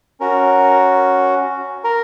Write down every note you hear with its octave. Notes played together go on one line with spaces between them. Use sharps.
C#4 F#4 A#4
A#4